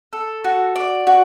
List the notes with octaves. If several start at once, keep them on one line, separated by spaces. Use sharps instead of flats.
A4
F#4
D5
F#4